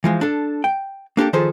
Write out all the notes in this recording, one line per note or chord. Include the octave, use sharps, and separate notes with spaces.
E3 F3 G#3
D4 A4
G5
A#3 D4 G4 A4
D#3 F3 G#4 A4 C5